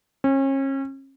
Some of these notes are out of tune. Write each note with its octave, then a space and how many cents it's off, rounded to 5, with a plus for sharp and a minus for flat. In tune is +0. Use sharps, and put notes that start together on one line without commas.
C#4 -35